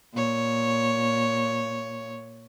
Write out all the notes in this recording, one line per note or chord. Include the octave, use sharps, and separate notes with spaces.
A#2 C#5